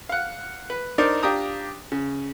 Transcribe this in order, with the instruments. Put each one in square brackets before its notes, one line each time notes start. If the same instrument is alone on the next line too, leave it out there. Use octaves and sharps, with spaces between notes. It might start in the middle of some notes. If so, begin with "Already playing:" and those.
[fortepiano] F5 F#5
B4
D4 D#4 A#4 C5 D5
D4 F4 G4 G5 A#5 D#6
C#3